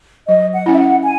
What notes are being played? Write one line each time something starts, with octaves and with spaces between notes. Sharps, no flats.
F#3 D#5
F#5
C#4 E4
E5
F#5
G#5